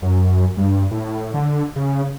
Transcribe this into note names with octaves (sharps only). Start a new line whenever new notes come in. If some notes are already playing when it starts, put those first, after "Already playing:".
F#2
G2
A2
D3
C#3